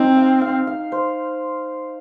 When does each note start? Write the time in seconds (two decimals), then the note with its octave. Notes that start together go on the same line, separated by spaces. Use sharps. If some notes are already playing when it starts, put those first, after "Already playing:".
Already playing: C4 D#4
0.17 F5
0.41 F5
0.67 F5
0.92 C5